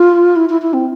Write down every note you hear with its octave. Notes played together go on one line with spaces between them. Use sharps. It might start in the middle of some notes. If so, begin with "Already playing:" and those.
Already playing: F4
E4
E4
E4
C4